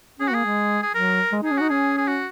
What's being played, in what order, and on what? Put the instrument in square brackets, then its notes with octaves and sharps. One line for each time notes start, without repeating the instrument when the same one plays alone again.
[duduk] C#4 [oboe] G#4
[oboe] F#4
[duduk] A#3 [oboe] G#4
[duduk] G#3
[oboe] G#4
[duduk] F#3 [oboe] A#4
[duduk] G#3
D#4
[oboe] G#4
[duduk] C#4
[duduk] D#4 [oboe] F#4
[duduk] C#4 [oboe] G#4
[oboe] G#4
F#4